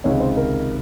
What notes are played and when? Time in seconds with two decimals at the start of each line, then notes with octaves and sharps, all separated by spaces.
0.04 C#2 C3 D#3 C#5
0.20 C5
0.37 A#4